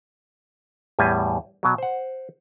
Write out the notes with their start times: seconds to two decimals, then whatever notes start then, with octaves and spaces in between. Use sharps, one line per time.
0.99 E2 A2 G3 G#5
1.63 B2 F#3
1.78 C5 F#5